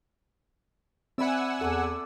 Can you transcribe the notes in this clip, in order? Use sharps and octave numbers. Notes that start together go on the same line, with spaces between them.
C4 D5 E5 F#5 G#5 B5 E6
E2 A4 D6